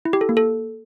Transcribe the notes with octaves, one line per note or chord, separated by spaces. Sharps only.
E4
G4
A4
A#3
A4